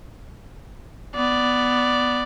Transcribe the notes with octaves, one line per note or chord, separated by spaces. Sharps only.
B3 D5